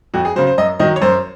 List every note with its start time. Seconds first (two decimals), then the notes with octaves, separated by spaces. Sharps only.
0.14 F2 F#4
0.25 G#4
0.36 C#3 F#3 C5
0.47 C5
0.58 F#2 D#5
0.79 D#3 F#3 D#5
0.96 C#5
1.02 F#2 C5